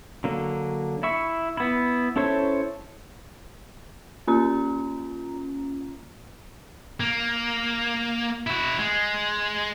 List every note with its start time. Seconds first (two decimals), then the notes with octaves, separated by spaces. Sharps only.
0.24 D3 F#3 A#3
1.03 E4 E5 C#6
1.57 B3 E4
2.16 C#4 E4 A4 C5 C#5
4.27 A#3 C#4 F4 A#5
7.00 A#3
8.47 E4 F#4
8.79 G#3